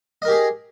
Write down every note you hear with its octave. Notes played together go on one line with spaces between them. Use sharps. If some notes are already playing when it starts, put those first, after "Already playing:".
G4 G#4 A#4 D#5